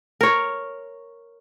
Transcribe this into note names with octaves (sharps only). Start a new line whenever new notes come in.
A#4 C#5